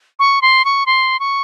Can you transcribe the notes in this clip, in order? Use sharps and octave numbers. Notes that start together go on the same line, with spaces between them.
C#6
C6
C#6
C6
C#6